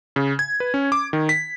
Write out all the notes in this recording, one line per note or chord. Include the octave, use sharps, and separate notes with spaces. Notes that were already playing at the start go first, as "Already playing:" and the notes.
C#3
G#6
B4
C#4
D6
D#3
B6